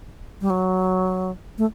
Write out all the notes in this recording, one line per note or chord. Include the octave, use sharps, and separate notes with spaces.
G3
F#3
A3